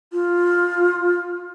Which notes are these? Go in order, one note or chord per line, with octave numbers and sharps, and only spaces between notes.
F4